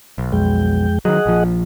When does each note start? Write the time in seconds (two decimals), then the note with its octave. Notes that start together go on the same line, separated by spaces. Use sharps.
0.18 B1
0.32 F2 G#3 G5
1.05 D#3 F#3 G#4 D#5 F#5
1.26 A#1 F3